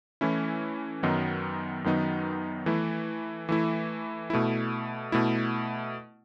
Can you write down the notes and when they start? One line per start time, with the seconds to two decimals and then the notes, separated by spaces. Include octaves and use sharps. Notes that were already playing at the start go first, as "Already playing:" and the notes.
0.21 E3 A3 C#4 E4
1.03 F#2 D#3 F#3 B3 D#4
1.84 F#2 D#3 F#3 B3 D#4
2.66 E3 A3 E4
3.49 E3 A3 E4
4.30 B2 A3 E4
5.12 B2 A3 E4